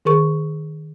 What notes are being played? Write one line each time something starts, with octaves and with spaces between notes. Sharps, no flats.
D#3 G#4 A#4 C#6